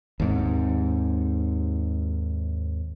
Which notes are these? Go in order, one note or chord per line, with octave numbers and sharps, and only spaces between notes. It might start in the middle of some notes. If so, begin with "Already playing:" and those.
D#2 G#2 C3